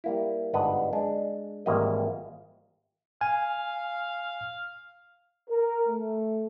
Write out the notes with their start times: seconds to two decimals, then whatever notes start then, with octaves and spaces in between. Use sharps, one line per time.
0.04 G3 A#3 E4
0.53 G1 G#2 D4 B4 D#5 F#5
0.93 G#3 D4
1.66 G#1 E3 G3 A#3 E4 D#5
3.21 F5 G#5
5.48 A#4
5.88 A3